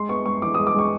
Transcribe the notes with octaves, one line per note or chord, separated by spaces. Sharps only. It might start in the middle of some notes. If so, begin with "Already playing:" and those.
Already playing: G#3 C6
B3 C#6
G#3 C#6
E3 D6
G#3 D#6
D6
G#3 C#6